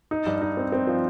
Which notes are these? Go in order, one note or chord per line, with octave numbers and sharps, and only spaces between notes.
D#4
G2
D#4
C4
C4
F3